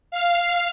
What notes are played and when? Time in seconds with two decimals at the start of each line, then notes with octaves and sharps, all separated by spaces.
0.11 F5